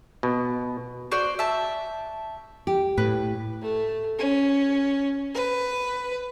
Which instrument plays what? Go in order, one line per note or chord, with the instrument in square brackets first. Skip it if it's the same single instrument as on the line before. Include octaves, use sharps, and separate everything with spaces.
[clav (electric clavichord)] B2
[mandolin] F#4 C5 D5
E5 A5
[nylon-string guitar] G4
[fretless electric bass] A2 [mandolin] B4
[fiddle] A3
C#4
B4